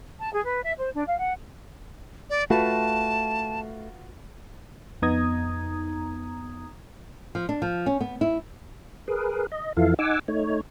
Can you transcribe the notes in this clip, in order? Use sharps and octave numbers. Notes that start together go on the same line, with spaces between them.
A5
G#4
B4
E5
C5
D4
F5
F#5
D5
A3 F4 F#4 B4 A5
F2 B3 D#4 A#5 D#6 G#6
F3
D4
F3
C#4
B3
E4
G#4 A#4 B4
D#5
F2 E3 E4 F4 A4 F5
D#4 F#5 G#5 D6 E6
A3 D#4 C#5